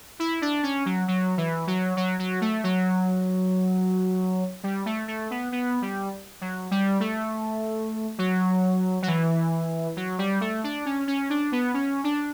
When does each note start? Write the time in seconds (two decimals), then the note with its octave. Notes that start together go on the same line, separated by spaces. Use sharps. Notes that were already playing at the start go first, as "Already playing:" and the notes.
0.19 E4
0.42 D4
0.63 C#4
0.86 F#3
1.08 F#3
1.37 E3
1.67 F#3
1.97 F#3
2.19 F#3
2.41 A3
2.64 F#3
4.63 G3
4.86 A3
5.08 A3
5.31 B3
5.52 B3
5.82 G3
6.41 F#3
6.71 G3
7.00 A3
8.18 F#3
9.03 F#3
9.07 E3
9.97 F#3
10.18 G3
10.41 A3
10.64 D4
10.86 C#4
11.08 C#4
11.30 D4
11.52 B3
11.74 C#4
12.04 D4